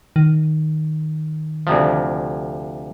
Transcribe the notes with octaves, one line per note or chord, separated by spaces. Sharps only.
D#3
D2 C3 F3